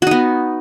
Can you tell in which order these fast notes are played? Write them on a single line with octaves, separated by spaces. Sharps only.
F#4 D#4 B3